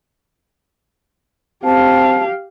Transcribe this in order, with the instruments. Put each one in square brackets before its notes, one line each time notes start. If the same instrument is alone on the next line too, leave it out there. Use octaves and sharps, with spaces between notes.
[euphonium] C4 [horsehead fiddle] G4 F5 [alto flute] A5